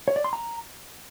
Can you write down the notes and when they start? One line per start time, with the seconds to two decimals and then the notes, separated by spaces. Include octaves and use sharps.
0.08 C#5
0.16 D5
0.24 C6
0.33 A#5